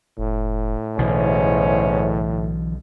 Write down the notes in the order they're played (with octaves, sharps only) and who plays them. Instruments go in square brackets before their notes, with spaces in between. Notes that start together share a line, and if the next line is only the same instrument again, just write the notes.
[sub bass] F1 [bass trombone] A2
[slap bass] B1 B2 D3 [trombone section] E2 G#2 C#4 [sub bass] E3